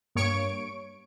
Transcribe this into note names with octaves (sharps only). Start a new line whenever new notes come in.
G2 A#3 C#5 C#6 D7